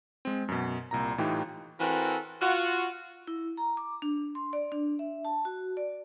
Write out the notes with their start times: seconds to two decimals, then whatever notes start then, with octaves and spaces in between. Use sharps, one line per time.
0.25 G#3 C4
0.48 F#2 B2
0.91 C2 A#2 A#5
1.18 A2 E3 D#4 F4 G4 G5
1.79 E3 C4 F#4 A4 A#4
2.40 F4 F#4
3.27 E4
3.57 A#5
3.77 D6
4.02 D4
4.35 C6
4.53 D5
4.72 D4
4.99 E5
5.25 A5
5.45 F#4
5.77 D5